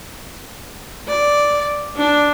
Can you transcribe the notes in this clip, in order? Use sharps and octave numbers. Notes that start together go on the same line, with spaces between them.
D5
D4